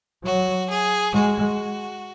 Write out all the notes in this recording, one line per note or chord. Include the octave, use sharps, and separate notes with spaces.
F#3 F#4
G#4
G#3 F#4